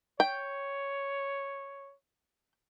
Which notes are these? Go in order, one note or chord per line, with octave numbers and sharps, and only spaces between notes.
C#5 G5